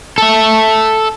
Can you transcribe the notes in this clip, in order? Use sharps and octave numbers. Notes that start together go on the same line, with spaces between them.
A4 E5